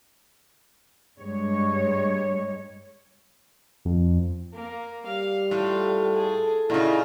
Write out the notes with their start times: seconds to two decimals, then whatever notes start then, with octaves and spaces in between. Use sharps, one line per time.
1.20 G2 G#3 C#5
3.85 F2
4.54 A#3
5.06 G3 F5
5.51 A2 F4
6.13 G#4 A4
6.70 A#2 C#3 D#4 E4 F#4